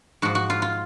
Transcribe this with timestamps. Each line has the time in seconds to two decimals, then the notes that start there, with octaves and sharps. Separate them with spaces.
0.22 G#2 F3 F#4
0.35 F#4
0.50 F4
0.62 F4